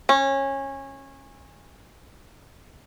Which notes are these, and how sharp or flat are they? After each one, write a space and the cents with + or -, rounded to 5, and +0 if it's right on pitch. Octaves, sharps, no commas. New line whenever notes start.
C#4 -20